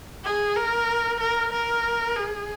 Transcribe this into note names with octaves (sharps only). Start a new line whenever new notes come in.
G#4
A#4
A#4
A#4
G#4